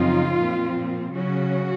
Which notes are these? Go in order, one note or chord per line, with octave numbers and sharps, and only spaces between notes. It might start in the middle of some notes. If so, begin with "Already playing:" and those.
Already playing: F#2 C#3 F3 C4 D#4 F4
A#2 F3 C4
C#3 F#3 C#4 F#4